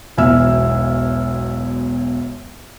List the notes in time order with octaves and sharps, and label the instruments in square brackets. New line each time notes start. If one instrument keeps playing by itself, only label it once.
[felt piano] E1 B1 E5 E6 F6